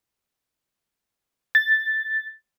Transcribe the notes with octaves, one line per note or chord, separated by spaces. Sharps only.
A6